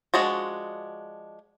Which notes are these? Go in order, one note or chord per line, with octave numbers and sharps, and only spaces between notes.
F3 G#3 D4 F#4